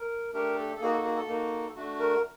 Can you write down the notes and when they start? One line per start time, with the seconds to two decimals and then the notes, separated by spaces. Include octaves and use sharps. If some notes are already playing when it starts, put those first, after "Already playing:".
Already playing: A#4
0.33 A3 D4 G4 A#4
0.57 A4
0.75 A4
0.80 A#3 D#4 F#4 G#4
0.93 A4
1.04 G#4
1.16 A4
1.27 A#3 D#4 F#4
1.75 A3 D4 F#4
1.99 A#4